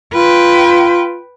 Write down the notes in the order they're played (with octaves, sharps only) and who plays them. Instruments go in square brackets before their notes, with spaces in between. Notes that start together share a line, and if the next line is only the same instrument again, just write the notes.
[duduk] F4 [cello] B4 G5